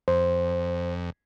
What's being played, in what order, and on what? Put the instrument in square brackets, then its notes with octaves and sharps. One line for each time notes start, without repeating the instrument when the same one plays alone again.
[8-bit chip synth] F2 [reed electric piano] C5